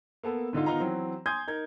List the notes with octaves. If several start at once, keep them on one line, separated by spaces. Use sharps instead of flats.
A#3 B3 A4
G#2 D3 D#4 F4
D#3 B3 D#4 F4 A#5
E3 F#3 C4
G#5 C6 D#6 G6 G#6
D#4 A#4 G#6